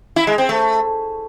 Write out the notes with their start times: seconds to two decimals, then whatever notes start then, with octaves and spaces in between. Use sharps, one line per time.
0.16 E4
0.27 G#3
0.38 C4
0.49 A3